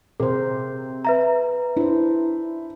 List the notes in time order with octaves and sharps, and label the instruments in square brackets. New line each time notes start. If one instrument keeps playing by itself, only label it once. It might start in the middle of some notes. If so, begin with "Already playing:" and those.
[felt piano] C3 [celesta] G#4 [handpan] A#4 C5
[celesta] B4 E5 A#5
[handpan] D4 C5 [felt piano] E4